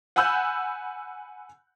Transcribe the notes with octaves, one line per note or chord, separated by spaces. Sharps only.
F#5 G#5 B5 E6 F#6 G6